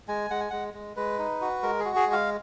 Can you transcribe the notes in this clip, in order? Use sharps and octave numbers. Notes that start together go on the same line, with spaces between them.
G#3 G#5
G#3 F#5
G#5
G#3 F#5
G#3
G#3 B4
D#4
F#4
G#3 A#4
G#4
F#4
G#4
G#3
F5